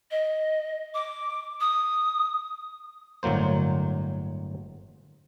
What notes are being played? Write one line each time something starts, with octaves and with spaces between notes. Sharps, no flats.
D#5
D6
D#6
G1 A2 F#3 A#3 C5